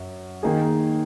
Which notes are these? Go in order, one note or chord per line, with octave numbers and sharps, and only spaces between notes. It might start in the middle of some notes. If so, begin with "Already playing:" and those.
Already playing: F#2
D#3 A#3 D#4 G#4